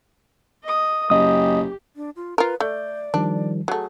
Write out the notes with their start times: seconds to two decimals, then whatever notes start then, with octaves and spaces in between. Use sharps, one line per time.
0.64 D#5 D#6
1.10 F#1 G4 D#5 D#6
1.96 D4
2.16 F4
2.38 F4 A#4 B4
2.60 A3 D5 G6
3.14 D#3 F3 G3 D4
3.68 F#3 A3 G#4